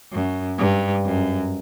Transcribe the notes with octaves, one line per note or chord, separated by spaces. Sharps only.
F#2
G2
F#2